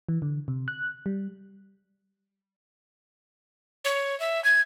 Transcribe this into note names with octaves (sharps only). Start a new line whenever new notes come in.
E3
D3
C3
F#6
G3
C#5
E5
G#6